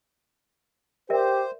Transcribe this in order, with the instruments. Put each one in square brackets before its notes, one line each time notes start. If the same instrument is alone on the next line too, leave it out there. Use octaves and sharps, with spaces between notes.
[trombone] G4 [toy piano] A#4 D5 E5 [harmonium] C5